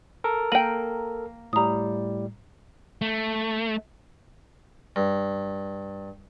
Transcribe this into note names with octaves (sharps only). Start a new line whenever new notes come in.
A4 A#4
A#3 G5 D#7 F#7
A2 G3 A#5 D#6
A3
G2